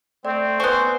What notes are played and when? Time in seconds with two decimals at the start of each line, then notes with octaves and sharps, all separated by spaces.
0.25 A3 C4 D5
0.60 B3 C5 G#5 C#6